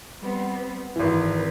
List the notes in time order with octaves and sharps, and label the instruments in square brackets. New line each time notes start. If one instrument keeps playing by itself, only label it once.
[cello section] G3 B3 C4
[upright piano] G#1 E3 [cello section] C4 A#4 B4